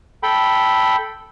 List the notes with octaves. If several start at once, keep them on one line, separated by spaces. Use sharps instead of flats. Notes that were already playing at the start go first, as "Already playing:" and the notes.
A4 G5 B5